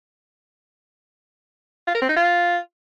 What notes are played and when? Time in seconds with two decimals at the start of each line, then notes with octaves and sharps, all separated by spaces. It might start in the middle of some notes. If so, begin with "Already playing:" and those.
1.88 F4
1.95 A#4
2.02 C4
2.09 D#4
2.16 F4